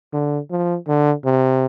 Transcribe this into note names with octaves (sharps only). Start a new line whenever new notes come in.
D3
F3
D3
C3